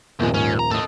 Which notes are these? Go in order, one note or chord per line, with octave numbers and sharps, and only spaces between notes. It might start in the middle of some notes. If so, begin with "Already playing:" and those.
D#1 C2 F3 G#3
G#2 C#4
A#5
A2 A4 D#5